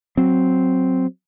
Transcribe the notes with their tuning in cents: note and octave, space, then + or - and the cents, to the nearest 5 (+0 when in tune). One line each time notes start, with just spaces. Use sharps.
F#3 +0 C4 +0